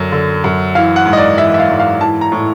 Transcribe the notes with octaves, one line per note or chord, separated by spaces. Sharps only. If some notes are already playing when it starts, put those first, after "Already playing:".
Already playing: F#2 D3
D3
F#2
E3 F5
F#5
G#2
D#5
D5
E3 E5
E5
F5
G#2
F5
E3 A5
A#5
A2